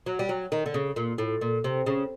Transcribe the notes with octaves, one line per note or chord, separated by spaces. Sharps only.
F#3
G3
F#3
D#3
D3
C#3
A#2
A2
A#2
C3
C#3